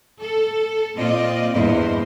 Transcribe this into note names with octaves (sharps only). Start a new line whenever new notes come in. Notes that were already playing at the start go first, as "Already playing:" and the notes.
A4
A#2 C4 F4 D5 D#5
E2 G2 A#2 E4 C5 D#5